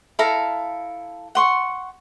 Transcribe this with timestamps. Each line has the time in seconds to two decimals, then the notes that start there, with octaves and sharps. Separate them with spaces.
0.19 E4 A4 F5 A#5
1.35 F#5 C6 C#6